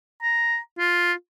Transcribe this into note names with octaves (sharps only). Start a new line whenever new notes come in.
A#5
F4